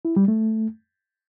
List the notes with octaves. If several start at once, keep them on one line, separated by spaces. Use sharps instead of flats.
E4
G3
A3